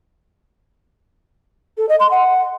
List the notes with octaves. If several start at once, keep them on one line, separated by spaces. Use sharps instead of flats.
A4
D#5
C6
F#5